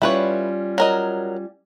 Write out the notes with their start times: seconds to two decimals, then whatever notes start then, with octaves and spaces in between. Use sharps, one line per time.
0.02 G3 C#4 E4 F4 B4 C#5
0.78 F#3 A#4 D#5